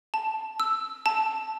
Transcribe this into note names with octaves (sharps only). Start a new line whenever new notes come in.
A5
E6
A5